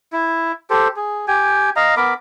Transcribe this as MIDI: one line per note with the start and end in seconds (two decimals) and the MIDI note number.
0.13 0.52 64
0.70 0.88 67
0.70 0.88 69
0.70 0.88 72
0.96 1.26 68
1.28 1.70 67
1.28 1.70 79
1.28 1.70 80
1.76 1.95 75
1.76 1.95 77
1.76 1.95 82
1.97 2.14 59
1.97 2.14 70
1.97 2.14 83
1.97 2.14 86